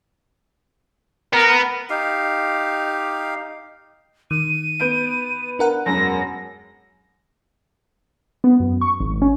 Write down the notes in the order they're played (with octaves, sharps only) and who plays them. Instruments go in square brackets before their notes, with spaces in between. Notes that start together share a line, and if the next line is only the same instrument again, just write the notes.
[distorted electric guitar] B3 [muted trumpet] A#4
[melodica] D#4 G4 F5
[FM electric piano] D#3 [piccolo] D#7
[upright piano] B3 G6 D7
[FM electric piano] D4 A#4 F#5
[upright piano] E1 F#2 [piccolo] A#6
[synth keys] B3
F#2
C#6
G#1
C#4